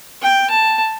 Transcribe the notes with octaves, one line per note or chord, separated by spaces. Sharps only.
G5
A5